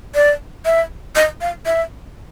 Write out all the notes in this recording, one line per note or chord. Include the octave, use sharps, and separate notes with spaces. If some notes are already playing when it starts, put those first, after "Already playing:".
D5
E5
D#5
F5
E5